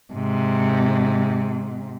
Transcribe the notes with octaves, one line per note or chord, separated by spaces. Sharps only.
G#2 C3